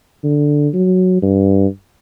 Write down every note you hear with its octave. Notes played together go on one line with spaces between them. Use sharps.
D3
F#3
G2